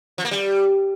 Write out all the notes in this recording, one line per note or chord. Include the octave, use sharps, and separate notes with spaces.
F3
A#3
G3